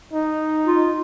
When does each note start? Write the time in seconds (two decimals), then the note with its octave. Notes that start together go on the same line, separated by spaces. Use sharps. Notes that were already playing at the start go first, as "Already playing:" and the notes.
0.13 D#4
0.67 F4